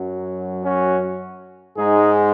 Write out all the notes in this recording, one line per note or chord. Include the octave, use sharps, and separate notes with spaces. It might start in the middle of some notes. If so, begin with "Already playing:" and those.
Already playing: F#2 F#3
C#4 F#4
G#2 G#3 D#4 G#4